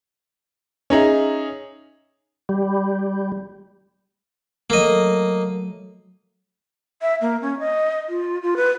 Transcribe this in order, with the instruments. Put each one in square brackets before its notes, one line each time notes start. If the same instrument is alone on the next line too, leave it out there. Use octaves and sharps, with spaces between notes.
[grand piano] C#4 D#4 G#4 E5
[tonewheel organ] G3
[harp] F#3 A3 [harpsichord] A#3 D#5
[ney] E5
A#3
C#4
D#5
F4
F4
B4